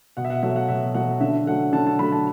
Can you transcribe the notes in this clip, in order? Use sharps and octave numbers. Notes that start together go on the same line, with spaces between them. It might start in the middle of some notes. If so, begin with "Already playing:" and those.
B2 F#5
E5
F#5
F#3 A3 E5
F#5
B2 E5
F#3 A3 F#5
D3 E5
F#3 A3 F#5
D3 A5
A5
F#3 A3 B5
A5